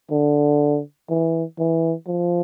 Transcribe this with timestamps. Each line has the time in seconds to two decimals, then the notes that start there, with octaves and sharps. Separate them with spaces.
0.11 D3
1.09 E3
1.59 E3
2.07 F3